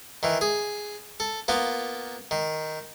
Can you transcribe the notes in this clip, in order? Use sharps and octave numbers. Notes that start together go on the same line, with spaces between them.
D#3 E3
G#4
A4
A#3 B3 F4
D#3